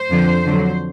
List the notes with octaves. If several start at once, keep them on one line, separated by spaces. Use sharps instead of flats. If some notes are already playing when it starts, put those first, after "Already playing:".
Already playing: C5
F2 D3 F3
F2 D3 F#3